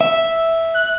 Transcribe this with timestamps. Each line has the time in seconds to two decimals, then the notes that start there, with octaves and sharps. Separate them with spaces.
0.01 E5
0.74 F#6